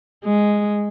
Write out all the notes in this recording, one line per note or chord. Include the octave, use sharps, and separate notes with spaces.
G#3